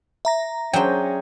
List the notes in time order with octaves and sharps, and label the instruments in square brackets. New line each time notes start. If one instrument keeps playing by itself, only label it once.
[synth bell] E5 A#5 A#6
[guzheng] F#3 D4 C5 [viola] C#4 G#4 [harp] G5